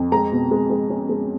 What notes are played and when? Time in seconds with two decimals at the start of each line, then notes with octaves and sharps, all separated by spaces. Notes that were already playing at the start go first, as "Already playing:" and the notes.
Already playing: F2
0.12 G#3 A#5
0.32 B2
0.51 G#3
0.70 G#3
0.90 C#4
1.09 G#3